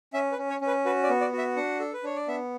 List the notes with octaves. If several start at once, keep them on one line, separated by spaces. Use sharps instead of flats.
C#4 E5
B4
C#4
C#5
C#4
B4
F#4 B4
D5
B3
D5
F#4
E5
D4 F#5
A4
B4
D4 C#5
D5
B3 E5